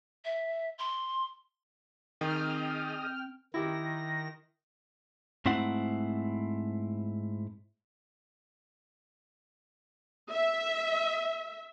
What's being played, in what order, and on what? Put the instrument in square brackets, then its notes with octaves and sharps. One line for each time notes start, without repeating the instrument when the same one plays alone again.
[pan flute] E5
C6
[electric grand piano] D#3 [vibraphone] C4 [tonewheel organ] G#4 D#5 D#6 [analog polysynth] G5 F6
[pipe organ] D#3 A#6 [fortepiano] E4 G4
[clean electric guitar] G#2 A3 C4 E4 F#5
[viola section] E5